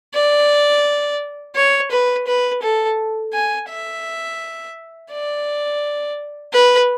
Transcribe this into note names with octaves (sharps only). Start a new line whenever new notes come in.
D5
C#5
B4
B4
A4
G#5
E5
D5
B4